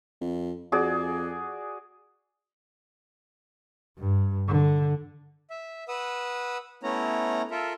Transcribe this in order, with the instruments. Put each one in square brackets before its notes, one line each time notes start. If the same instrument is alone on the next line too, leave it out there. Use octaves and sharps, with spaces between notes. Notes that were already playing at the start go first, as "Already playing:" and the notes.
[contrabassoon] F2
[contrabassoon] F2 [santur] F#4 G#4 D5
[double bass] G2
D3
[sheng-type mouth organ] E5
B4 F#5 D#6 E6
A3 B3 C#4 E4 C#5 A#5
F4 A4 A#4 E5